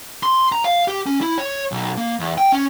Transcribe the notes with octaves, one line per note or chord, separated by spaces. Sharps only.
C6
A#5
F5
G4
C#4
E4
C#5
B1
A#3
E2
G5
C#4